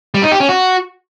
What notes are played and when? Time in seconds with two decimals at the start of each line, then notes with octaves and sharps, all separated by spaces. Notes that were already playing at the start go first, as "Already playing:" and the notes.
0.14 G3
0.23 D#4
0.32 G4
0.40 C#4
0.49 F#4